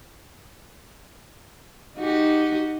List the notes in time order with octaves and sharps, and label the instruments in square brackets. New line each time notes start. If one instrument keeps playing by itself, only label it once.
[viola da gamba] D#4 F#4 G4